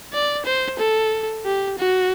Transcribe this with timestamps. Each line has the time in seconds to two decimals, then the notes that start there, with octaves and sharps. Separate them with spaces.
0.13 D5
0.45 C5
0.79 A4
1.45 G4
1.78 F#4